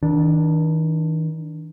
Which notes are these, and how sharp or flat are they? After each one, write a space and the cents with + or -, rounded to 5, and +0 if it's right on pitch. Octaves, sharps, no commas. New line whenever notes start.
D#3 +45 D4 +0